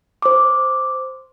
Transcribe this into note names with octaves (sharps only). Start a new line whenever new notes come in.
C5 D6